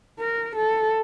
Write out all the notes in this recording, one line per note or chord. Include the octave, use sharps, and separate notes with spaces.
A#4
A4